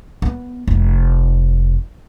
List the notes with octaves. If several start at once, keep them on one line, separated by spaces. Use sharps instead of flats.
B3
F1